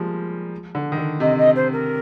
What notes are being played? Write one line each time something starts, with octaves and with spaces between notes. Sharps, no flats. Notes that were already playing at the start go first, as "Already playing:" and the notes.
Already playing: F3 G3 G#3 A#3
D3
D#3
D3
C3 D#5
D#5
C5
A#4